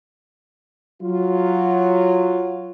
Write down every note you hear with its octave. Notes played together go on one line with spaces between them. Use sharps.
F#3 F4